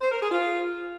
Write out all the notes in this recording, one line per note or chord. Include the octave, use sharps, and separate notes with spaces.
C5
A#4
G#4
F4